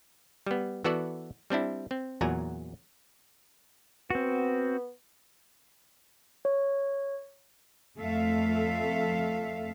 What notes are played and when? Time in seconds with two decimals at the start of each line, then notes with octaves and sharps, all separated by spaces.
0.47 G3 B3
0.84 E3 B3 F#4 A4 D5 F#5
1.50 G3 C4 D4 E4
1.91 C4
2.21 E2 A#2 F#3 F#5 G#5 A#5
4.10 B3 C4 F#4
6.45 C#5
7.99 F2 A3 A4 E5 F5